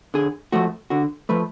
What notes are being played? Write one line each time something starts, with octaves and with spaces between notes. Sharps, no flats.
D3 G#4
F3 A3 F#4
D3 F#4
F3 A3 B4